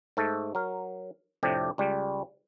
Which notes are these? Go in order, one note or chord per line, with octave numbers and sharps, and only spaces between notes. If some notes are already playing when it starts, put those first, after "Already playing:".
G#2 A3 A4
F#3 A#4
F2 A2 C3 D4 G4
C#2 G3